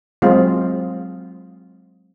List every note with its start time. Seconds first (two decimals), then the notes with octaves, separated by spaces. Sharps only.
0.22 F#3 G#3 C4 F4